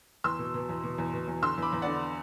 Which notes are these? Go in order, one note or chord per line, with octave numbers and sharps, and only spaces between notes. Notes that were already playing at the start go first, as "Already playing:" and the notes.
E2 C6 E6
B2
B2
E2
B2
E2
B2
E2
D3 C6 E6
E2 B5 D6
E2
D3 D5 F#5